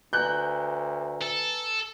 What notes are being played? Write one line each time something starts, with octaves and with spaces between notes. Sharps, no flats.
D2 B4 G#5 A#5 F#6 G6
A4